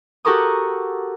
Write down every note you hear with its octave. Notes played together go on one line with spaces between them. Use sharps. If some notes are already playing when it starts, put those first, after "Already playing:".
F#4 G4 A4 A#4 C#6 D#6